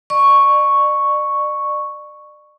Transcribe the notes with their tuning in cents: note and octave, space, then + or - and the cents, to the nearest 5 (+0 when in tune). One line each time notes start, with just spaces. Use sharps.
D5 +35 C#6 +0